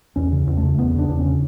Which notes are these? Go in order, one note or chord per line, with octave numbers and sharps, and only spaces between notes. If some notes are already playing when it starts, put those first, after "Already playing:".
E2 C#4
C#3
E2
A3
C#3
E2 B3
C#3 D4
E2
C#4
C#3